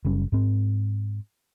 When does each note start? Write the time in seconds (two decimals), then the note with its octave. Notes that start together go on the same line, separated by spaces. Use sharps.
0.05 F#1 G3 C#4
0.32 G#2 C4